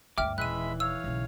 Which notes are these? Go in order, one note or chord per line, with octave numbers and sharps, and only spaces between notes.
D2 G2 E5 G5 D6 F6
D#1 E3 G#3 E5 B5 F#6 D#7
C#5 F5 E6
B1 C#3